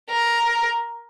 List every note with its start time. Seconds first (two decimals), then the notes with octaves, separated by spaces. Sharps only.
0.10 A#4